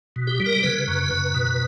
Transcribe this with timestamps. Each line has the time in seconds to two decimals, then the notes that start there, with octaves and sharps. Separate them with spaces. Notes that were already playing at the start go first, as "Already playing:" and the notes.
0.16 B2
0.27 G4
0.40 G3
0.46 A#4
0.63 C#3 B4
0.88 F#2
1.11 F#2
1.35 B2